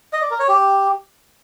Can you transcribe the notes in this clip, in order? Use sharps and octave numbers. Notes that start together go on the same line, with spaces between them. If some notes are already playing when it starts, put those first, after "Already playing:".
D#5
D5
A#4
C#5
G4